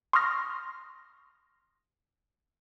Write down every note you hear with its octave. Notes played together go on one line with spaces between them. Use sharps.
C6 C#6 D#6 F6 A#6